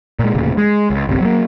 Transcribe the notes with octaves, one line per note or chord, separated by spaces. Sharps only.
A#2 G#3
E1 D2 A#2 C#3
G#3
C#2
G1 C2 C3
F#3 G3 A#3